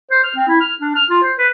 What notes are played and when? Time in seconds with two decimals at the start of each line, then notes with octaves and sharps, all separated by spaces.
0.11 C5
0.24 F6
0.36 C4
0.48 E4
0.61 F6
0.81 D4
0.96 F6
1.10 F4
1.23 C5
1.39 B4